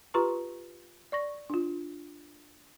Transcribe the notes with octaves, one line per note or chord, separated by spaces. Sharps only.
F4 G4 B4 A#5 C6 C#6
D5 C#6 A#6
D4 F4